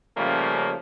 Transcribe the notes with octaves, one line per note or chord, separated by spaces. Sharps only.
C#3 F3 G3 A3 A#3 C#4